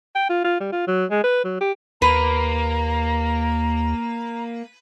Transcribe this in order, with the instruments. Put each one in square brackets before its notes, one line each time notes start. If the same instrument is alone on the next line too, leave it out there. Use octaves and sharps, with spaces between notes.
[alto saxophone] G5
F4
F4
G3
F4
F#3
G#3
B4
F#3
G4
[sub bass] D#2 [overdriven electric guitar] A#3 [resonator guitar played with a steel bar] B4 [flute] A#5